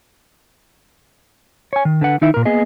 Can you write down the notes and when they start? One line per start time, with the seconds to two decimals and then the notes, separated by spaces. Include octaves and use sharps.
1.73 C#5 G#5
1.85 D#3
2.01 D3 B4 F#5
2.21 D#3 D#4 E4 E5
2.34 A#2 A#4
2.45 A#3 B3 G#4 D#5